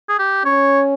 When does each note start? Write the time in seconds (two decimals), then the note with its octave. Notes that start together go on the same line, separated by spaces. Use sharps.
0.09 G#4
0.19 G4
0.45 C#4 C#5